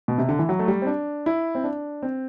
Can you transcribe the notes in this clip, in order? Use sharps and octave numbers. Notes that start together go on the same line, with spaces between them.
B2
C3
D3
E3
F#3
A3
G3
C4
D4
E4
C4
D4
C4